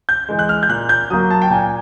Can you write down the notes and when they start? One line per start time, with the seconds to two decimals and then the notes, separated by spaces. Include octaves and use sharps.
0.09 G6
0.29 E3 G#3
0.39 F#6
0.49 F6
0.63 G6
0.69 A#2 F#6
0.89 G6
1.10 F#3 A#3 D#6
1.30 A5
1.42 G5
1.50 A#2 G#5